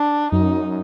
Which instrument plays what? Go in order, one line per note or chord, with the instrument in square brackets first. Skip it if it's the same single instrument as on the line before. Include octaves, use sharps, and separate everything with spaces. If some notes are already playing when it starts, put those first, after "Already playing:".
Already playing: [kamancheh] D4
[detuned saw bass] F#2 [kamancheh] D#4